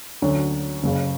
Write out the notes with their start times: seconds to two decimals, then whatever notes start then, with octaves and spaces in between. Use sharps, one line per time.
0.22 D2 D3 F#3 C#4
0.83 F#1 F#2 C#3